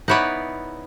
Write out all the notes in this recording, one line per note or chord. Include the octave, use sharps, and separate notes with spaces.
B3 D#4 E4 C#5 D5 F#5